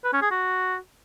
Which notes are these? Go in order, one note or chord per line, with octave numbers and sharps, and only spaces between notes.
B4
C#4
G#4
F#4